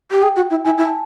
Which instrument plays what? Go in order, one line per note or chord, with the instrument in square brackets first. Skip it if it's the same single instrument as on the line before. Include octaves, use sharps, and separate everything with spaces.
[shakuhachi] G4
[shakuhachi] G#4 [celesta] G5
[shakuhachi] F#4
E4
[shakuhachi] E4 [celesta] G#5
[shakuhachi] E4
[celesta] A5